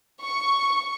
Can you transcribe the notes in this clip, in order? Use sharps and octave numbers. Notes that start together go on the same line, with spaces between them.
C#6